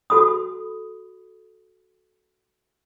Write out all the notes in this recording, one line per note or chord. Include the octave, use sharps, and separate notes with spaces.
F#4 A4 B5 D#6